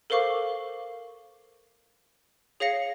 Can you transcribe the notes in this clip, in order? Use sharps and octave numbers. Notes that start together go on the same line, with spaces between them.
A4 A#4 C5 F5 C#6 D6
G#4 C#5 F5 A#6 C#7